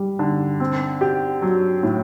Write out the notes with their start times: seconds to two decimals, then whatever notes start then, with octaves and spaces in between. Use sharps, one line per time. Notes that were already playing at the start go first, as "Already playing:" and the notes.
Already playing: G3
0.19 D3
0.60 C4
1.01 G4
1.42 F#3
1.83 A2